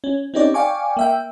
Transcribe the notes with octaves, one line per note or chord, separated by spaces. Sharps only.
C#4
C4 C#4 D#4 G4 C#5 D5
D5 F5 G5 G#5 C#6 D6
A#3 E5 G5